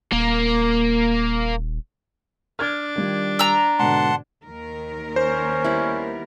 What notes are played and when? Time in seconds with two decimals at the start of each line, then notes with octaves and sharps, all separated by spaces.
0.13 D#1 A#3
2.59 D4 F6 G#6
2.96 D#3 G3 F4
3.39 A#5 E6
3.79 G#2 B2 D3 F#5 A5 C6
4.44 D#2 D#3 A#4
5.16 C#4 C5
5.64 G3 B3 E4